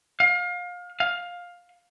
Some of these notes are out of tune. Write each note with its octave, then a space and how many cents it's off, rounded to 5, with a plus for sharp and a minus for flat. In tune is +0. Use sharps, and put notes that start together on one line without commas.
F5 +30
F5 +15